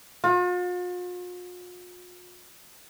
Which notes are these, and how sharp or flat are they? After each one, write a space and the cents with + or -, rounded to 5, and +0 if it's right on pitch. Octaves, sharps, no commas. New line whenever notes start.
F4 +45